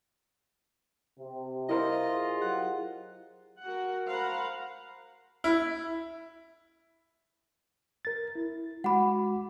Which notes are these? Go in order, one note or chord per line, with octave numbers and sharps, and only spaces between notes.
C3
E4 F4 A#4 C5 D#5
G#4
F#3 G4 F#5
F#4 A#4 F#5
A#4 C5 F5 F#5 A#5 B5
E4
A#4 A6
E4
G#3 F#4 F#5 B5 D6